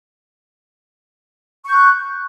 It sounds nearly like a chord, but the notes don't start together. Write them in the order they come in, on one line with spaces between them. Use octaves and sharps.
C#6 G6 F#6